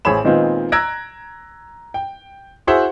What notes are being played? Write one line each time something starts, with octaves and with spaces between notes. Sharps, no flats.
A1 G#4 C5 C#5 B5 E7
A#2 D#3 G#3 B3 C4 F4
A#5 E6 F#6 G#6 A#6 D7
G5
E4 F#4 G#4 C5 E5 F#5